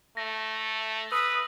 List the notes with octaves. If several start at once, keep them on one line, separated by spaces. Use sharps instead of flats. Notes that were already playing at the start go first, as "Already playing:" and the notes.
A3 A#6
B4 D#6 E6